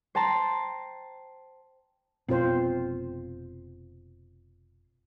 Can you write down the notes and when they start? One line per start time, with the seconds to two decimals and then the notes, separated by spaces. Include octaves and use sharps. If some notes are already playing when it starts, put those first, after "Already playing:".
0.15 C5 G5 A5 A#5 C6
2.29 F1 B2 C4 F4 C5